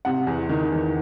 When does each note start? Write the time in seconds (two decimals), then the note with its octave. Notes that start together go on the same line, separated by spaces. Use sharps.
0.05 C3 F#5
0.27 E2
0.49 D#3
0.72 E2